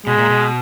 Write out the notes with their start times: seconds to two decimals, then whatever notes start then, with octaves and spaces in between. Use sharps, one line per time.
0.06 B2 G#3
0.18 A#2
0.30 B2